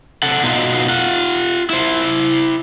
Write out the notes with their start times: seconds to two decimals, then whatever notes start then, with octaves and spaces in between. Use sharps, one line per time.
0.22 C3 A4 F#5
0.43 B2 D#4 F4 F#4
0.89 F4 F#5
1.70 E4 C5